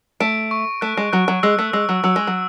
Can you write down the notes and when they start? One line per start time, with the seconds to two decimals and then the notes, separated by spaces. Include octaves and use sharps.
0.20 A3 D7
0.51 C#6
0.81 A3 F#6
0.97 G#3
1.12 F#3 F#6
1.28 F#3
1.43 G#3 E6
1.59 A3
1.73 G#3 E6
1.89 F#3
2.04 F#3 E6
2.16 G#3
2.27 F#3